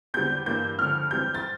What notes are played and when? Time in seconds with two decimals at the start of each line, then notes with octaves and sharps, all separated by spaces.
0.14 E2 D3 G3 C4 G6
0.46 G2 E3 A#3 G6
0.79 D2 D3 F3 C4 F6
1.10 F2 E3 G3 C4 G6
1.35 A6